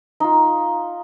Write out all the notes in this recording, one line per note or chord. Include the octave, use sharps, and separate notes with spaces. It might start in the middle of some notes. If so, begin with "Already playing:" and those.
D#4 F4